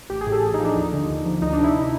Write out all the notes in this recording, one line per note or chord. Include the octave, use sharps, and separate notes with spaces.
A1 G4
G#4
A2
A4
A1 G#4
D#4
F3
D4
D#2 D#4
D3
D#2
F3
D2 D#4
D4
C3
E4